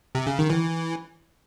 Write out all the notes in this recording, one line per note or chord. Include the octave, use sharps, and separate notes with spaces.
C3
C#3
D#3
E3